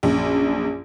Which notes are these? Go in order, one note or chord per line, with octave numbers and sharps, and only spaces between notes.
A#1 F#2